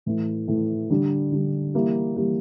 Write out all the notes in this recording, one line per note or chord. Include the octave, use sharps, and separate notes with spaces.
A2 E3 A3
A2 E3 A3
D3 G3 D4
D3 G3 D4
E3 G3 A#3 E4 G4
E3 G3 A#3 E4 G4